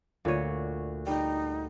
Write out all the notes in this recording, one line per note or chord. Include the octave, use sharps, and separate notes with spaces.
D2 A#2 C#5 D#7
G3 D#4 G5